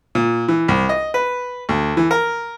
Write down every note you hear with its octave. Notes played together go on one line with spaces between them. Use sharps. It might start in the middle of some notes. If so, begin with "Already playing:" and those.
A#2
E3
C2
D#5
B4
D2
E3
A#4